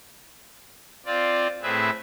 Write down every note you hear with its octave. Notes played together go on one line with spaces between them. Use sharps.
C4 F4 D5
A2 C4 G#4 B4 E5